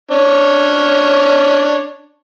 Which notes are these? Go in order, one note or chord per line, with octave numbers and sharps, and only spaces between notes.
C#4 D4 C#5